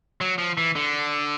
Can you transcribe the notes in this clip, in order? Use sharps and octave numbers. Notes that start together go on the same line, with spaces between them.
F#3
F3
E3
D3